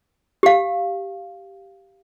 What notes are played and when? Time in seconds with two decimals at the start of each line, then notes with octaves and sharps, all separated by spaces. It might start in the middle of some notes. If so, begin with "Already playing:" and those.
0.43 G4 F5